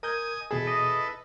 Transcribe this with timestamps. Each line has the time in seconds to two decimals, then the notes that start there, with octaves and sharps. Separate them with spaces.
0.03 A#4 D#5 G#5 D#6 G6 G#6
0.51 E2 B2 E4 G#4 A4 B4
0.67 D#5